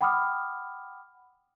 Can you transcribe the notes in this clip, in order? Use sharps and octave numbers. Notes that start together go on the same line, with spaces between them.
F#5 G5 B5 D6 D#6 F6